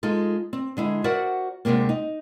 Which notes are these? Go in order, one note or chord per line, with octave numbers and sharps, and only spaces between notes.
G#3 D#4 F4 A4
C4
D3 G#3 E4
F#4 A#4 C5 D5 E5 F#5
D2 G2 C3 G#3 A#3
D#4